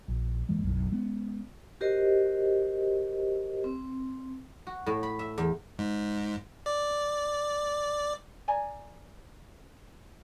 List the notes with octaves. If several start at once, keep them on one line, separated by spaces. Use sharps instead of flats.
A#1
G#2 E3 G#3 A#3
F#1 B1
G#3 B3 C#4
F#4 G4 A#4 C5 D#5
C4
F#4
A2
B5
E5
E2
G#2
D5
D5 G#5 A#5